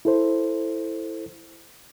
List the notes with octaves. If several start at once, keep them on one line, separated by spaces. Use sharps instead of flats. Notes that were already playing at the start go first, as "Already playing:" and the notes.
E4 A4 C5